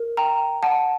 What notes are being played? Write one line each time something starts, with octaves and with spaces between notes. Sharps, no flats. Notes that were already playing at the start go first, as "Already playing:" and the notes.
Already playing: A#4
G5 A#5
F#5 A5